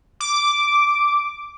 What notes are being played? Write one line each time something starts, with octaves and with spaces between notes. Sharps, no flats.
D6